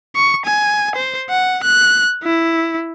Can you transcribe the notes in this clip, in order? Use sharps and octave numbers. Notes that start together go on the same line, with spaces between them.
C#6
G#5
C5
F#5
F#6
E4